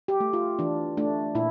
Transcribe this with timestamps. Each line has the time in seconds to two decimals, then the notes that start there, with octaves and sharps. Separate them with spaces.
0.08 G4
0.20 A3
0.33 F4
0.59 E3 D4
0.97 A3 D4
1.35 A#2 E4